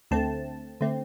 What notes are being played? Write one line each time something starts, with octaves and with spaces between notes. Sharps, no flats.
D2 D3 A3 C4 A5
D3 A3 C4